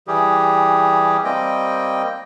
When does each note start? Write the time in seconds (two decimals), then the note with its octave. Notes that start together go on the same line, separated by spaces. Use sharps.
0.08 E3 G3 G4 G#4
1.25 G3 A#3 C4 D#5 G5